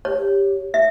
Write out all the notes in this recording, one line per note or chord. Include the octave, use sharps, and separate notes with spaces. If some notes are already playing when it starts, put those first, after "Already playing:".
G4 C#5
E5